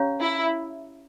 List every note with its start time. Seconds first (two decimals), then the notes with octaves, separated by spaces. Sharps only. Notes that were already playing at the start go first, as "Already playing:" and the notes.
Already playing: C#4 G4 C#5 F5 A#5
0.21 E4